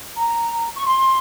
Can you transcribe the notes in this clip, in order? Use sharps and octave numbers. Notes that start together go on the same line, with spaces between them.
A#5
C#6
C6